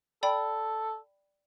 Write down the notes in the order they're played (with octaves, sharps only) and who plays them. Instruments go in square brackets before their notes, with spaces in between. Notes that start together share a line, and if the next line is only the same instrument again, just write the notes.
[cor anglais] A4 [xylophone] D5 G5 B5